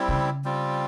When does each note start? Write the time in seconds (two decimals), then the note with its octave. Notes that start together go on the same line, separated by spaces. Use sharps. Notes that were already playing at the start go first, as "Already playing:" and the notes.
Already playing: G3 C4 E4
0.08 C#3
0.44 G3 C4 F4